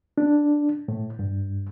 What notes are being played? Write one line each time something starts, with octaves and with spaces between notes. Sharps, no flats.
D4
A2
G2